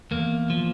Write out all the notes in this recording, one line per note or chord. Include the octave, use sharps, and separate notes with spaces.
E2 A#3
F3